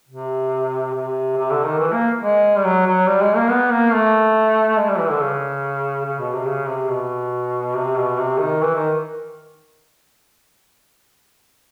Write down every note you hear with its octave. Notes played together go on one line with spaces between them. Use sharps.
C3
C3
C3
D3
D#3
E3
A#3
G#3
G3
F#3
F#3
G3
G#3
A#3
B3
A#3
A3
G#3
G3
E3
D3
C#3
C#3
B2
C3
C#3
C3
B2
C3
B2
C3
D#3
E3
D#3